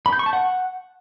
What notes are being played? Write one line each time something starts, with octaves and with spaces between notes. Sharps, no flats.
B5
G6
C#6
A5
F#5